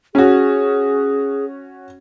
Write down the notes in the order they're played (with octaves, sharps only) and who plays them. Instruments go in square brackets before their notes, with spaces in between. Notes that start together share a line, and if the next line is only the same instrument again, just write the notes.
[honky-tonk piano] C#4 F#4 [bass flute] G#4